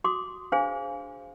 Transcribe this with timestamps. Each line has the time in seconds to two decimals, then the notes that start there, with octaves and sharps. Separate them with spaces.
0.04 F#4 C6 D6 D#6
0.52 D4 G#4 C5 F5 G#5